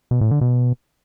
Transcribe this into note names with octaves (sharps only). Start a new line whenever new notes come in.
B2
A2
D3
B2